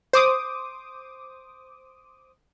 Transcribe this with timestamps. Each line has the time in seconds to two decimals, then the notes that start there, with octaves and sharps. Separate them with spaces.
0.13 C5 D6 D#6